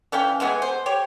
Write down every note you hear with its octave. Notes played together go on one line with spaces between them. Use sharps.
E3 C#4 F5 G5
E3 G#3 B3 G#4
C5
G4 C#5